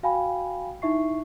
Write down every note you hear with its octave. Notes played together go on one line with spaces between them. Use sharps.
F#4 F5 G5 G#5 B5
D#4 E4 E5 C#6 C7